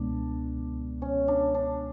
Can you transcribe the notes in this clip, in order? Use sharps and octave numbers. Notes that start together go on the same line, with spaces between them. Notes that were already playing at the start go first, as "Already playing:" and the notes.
Already playing: C#2 B2 G#3 B3 D4
C#4
D4
D4